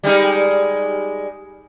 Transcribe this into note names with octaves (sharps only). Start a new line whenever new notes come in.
G3 G#3 D#4